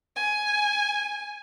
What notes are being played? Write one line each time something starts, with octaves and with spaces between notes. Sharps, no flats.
G#5